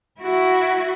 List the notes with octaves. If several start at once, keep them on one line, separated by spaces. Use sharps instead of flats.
E4 F#4